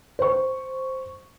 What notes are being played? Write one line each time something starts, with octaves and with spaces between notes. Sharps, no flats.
C5 C#6